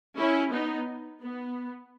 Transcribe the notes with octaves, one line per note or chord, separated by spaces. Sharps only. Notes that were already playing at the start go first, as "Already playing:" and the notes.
C#4 E4
B3 D#4
B3